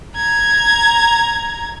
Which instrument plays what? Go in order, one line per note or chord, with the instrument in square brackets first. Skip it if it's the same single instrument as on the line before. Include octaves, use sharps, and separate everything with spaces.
[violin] A#5 G#6